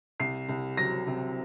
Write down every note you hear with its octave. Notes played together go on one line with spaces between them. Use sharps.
C2 C7
C2
F#3 A#6
C3